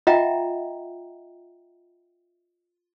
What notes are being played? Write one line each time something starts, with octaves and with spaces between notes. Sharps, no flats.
F4 D#5 E5 F#5 G5 A#5